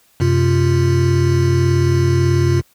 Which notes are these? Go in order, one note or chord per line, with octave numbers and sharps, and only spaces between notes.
F#2 C3 F4